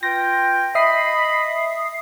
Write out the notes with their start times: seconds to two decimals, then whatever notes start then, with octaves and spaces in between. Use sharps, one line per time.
0.03 F4 B4 G5 A#6
0.75 D#5 E5 B5 D#6 C7